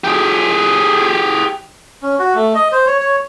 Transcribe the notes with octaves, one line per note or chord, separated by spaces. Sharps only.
G4 G#4
C#4
F#4
A3
D#5
C5
C#5
C#5